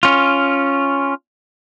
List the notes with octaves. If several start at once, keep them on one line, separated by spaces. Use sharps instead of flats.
C#4 F4